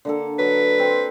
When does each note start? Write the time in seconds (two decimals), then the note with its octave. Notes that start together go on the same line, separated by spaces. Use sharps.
0.05 D3 A#3 A4
0.39 F#3 B4
0.79 C4 C6